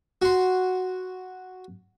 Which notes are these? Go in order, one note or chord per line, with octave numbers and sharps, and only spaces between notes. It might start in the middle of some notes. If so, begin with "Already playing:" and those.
F#4 C6